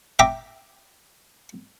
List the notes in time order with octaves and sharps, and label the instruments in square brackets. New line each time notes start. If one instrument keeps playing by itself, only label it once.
[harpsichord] E5 G5 A#5 D6